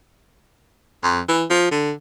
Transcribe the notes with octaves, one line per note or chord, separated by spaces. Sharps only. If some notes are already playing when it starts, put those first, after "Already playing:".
F2
E3
F3
D3